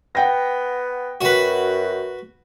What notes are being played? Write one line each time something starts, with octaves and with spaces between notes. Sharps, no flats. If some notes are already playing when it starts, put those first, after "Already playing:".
B3 F#5 G5 A#6
F#2 F#4 B4